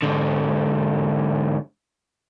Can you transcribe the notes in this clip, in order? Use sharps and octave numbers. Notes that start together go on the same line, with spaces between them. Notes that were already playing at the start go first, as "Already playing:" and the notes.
G#2 D3